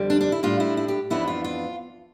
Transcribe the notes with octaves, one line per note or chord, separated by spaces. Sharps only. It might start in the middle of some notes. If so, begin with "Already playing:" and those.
Already playing: F2 D3 G3
D4
D4
E4
A2 G3 D4 F4
E4
E4
G4
F2 E3 B3 D4 E4
F4
F4